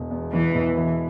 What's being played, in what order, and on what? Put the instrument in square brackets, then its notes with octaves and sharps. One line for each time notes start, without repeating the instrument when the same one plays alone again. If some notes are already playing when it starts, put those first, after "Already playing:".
Already playing: [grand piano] E1
E2
[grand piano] E2 [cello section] E3
[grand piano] E1
E3